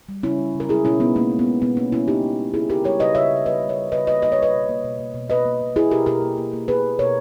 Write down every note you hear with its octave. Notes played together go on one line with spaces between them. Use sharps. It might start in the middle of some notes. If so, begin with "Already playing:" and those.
G3
C#3 C#4 E4
G3
C#3
A#4
G#3 E4 G#4
B2 C#4 E4
B2 B3 D#4
G#3 A#3 C#4
G#3
B3
G#3
B2 B3
G#3 A#3 C#4
B2 C#4 E4
G#3 D#4 G4
G#3
G#3
C#3 E4 G#4
C#3 G4 A#4
G3 A#4 C#5
C#3 B4 D#5
C#3 C#5 E5
C#3
G3 B4 D#5
G3
A#4 C#5
G3
C#3 B4 D#5
A#3 B4 D#5
A#3 D#5
C#5
G3 B4 D#5
B2
A#3
B2
A#3
B2
B2 B4 D#5
A#3
B2
A#3 E4 G#4
B2 G4 A#4
B2 G4 A#4
A#3
A#3
A#3
A#3 G#4 B4
A#3
B2 A#4 C#5